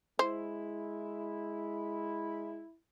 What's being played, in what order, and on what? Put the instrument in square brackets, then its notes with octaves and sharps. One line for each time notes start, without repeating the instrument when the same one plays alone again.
[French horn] G#3 [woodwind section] E4 [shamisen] C5